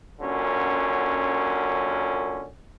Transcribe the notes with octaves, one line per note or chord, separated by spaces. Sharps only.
F#2 A#2 D3 C#4